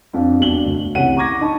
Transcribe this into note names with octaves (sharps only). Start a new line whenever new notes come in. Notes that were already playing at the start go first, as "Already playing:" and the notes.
F2 D4 F5
E1 B1 D4 F#7 G7
D2
C2 E3 C#4 F#5 D#7
A#5 C#6 D6 G#6 A#6
D#4 A5 B5 C#6